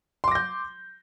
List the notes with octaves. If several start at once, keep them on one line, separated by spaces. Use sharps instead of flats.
C6 D6 G6 A#6